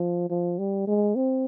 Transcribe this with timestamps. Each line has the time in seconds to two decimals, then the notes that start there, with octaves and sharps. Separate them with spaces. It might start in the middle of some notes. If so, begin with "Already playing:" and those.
Already playing: F3
0.30 F3
0.59 G3
0.87 G#3
1.16 C4